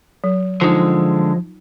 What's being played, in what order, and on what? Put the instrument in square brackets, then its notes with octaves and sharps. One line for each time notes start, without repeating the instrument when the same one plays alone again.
[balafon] F#3
[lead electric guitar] D3 G#3 [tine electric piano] F3 [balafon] D#4 F4